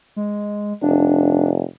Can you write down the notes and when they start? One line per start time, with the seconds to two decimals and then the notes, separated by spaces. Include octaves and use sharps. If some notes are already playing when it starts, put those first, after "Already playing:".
0.16 G#3
0.82 F1 D4